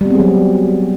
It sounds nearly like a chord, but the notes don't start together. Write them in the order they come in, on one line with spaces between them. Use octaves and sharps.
G3 B3 C4 G#4 F#3